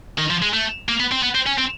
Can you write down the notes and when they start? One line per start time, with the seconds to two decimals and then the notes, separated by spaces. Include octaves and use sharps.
0.18 D#3
0.30 F3
0.42 G#3
0.53 A3
0.89 A#3
1.00 B3
1.12 C4
1.23 B3
1.35 C4
1.46 C#4
1.58 C4